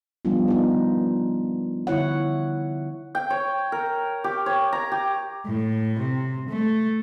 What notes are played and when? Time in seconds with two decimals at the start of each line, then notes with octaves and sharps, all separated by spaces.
0.25 F3 G3 B3 D4 F4
0.48 B3 D#4
1.87 D3 E4 C#5 F#5
3.15 G5
3.30 C#5
3.72 A#4
4.24 G4
4.46 C#5
4.73 A#5
4.92 G4
5.45 A2
5.99 C3
6.49 A3